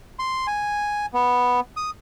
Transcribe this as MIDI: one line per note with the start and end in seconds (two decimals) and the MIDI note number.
0.19 0.47 84
0.47 1.06 80
1.14 1.60 59
1.77 1.90 87